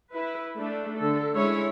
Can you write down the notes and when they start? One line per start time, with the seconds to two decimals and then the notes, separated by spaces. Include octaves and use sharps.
0.13 E4 B4
0.55 A3 D4
0.98 D3 A4
1.34 G#3 C#4 E4 C#5